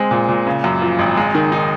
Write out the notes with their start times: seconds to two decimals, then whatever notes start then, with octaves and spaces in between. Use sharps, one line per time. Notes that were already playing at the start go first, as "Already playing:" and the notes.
Already playing: G#3 C4
0.11 A#2
0.29 A#2
0.47 C#3
0.64 F#2
0.82 F3
0.99 G#1
1.17 G#3
1.34 D#3
1.52 D#4